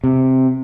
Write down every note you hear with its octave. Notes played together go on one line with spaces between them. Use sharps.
C3